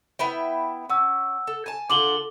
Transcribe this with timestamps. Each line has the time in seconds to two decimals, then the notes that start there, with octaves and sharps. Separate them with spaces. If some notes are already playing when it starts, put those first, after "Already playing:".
0.19 B3 E4 G5
0.90 C#4 F#5 E6
1.47 A4
1.66 G#5 A5
1.90 D3 F4 A4 D6 F#7 G7